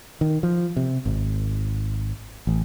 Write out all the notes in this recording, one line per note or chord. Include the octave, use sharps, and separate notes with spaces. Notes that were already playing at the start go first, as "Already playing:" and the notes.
D#3
F3
C3
G#1
A1